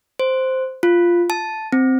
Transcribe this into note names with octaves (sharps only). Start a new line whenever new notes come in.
C5
F4
A5
C4